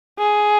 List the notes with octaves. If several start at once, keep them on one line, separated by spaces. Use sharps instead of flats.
G#4